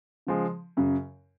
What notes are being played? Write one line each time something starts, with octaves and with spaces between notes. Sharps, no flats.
C#3 F3 G#3
F#2 C#3 F#3